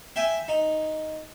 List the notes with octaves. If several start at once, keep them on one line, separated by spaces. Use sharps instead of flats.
E5 G5 G#5
D#4